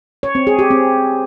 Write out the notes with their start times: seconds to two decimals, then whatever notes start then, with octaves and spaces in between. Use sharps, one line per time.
0.23 C#5
0.35 C4
0.47 G#4
0.59 G4
0.71 C4